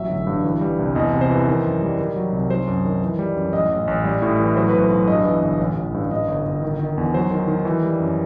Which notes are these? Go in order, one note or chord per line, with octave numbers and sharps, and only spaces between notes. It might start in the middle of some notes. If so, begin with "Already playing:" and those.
Already playing: A1 F#3 E5
G1
G2
E3
G3
C2
E2 D#5
C3
C5
E3
D#3
F#2
G3
D#3
F#3
C2
F#3 C5
F#2
D#3
E3
G3
F#2
A1 D#5
A1
A1
G3
A2
E3
F#3 C5
B4
B1
C5
B1
G2 D#5
E3
G1
A1
A1
G2
G2 D#5
G1
G1
D#3
D#3
E2
F#3 C5
D#3
D#3
E3
G3
F#2